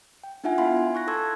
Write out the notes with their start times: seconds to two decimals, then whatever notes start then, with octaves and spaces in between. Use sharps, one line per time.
0.24 G5
0.44 D4 D#4 F4 E5 F#5 G#5
0.58 B3 D#4 E4 F5 B5 C6
0.77 G#5
0.95 C#6 F#6 A#6
1.07 A4 A5 C6 C#6 E6 G#6